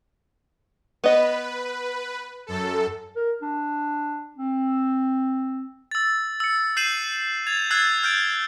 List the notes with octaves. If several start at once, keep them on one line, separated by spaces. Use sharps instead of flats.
B3 B4 D#5
F#2 A4
A#4
D4
C4
E6 A6
E6 C#7
E6 G6 C7 D#7 E7 F#7
G#6 A6 F7
E6 F#6 G#6 A6 C7
F6 G6 A6 D7